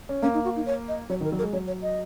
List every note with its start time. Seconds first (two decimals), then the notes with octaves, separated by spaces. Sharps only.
0.09 C#4
0.23 A#3 C#4
0.34 D#4
0.45 F#4
0.56 D#4
0.66 C#5
0.88 D#5
1.10 F#3 C#5
1.21 D#3 A#4
1.32 F#3
1.38 A#4
1.42 G#3
1.53 F#3 C#5
1.67 C#5
1.82 D#5